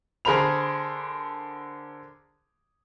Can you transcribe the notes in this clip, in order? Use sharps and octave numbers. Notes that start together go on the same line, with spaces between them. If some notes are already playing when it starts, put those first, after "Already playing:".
D3 G#4 A#4 C5 B5 F7